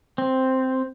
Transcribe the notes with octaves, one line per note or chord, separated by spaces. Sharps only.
C4